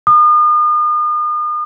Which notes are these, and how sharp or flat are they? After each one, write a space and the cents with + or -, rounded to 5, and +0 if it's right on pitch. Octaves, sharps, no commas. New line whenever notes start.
D#6 -40